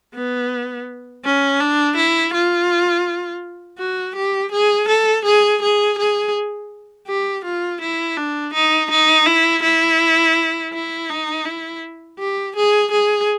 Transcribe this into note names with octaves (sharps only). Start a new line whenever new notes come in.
B3
C#4
D4
E4
F4
F#4
G4
G#4
A4
G#4
G#4
G#4
G4
F4
E4
D4
D#4
D#4
E4
E4
E4
D#4
E4
G4
G#4
G#4